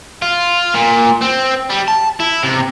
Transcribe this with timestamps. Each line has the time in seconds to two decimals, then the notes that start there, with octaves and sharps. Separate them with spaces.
0.22 F4
0.75 A#2
1.22 C4
1.70 G3
1.88 A5
2.20 E4
2.43 C3